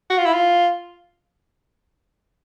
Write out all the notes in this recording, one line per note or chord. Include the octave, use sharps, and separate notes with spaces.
F#4
F4
E4
F4